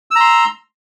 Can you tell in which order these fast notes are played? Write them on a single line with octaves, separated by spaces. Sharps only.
E6 A#5 C6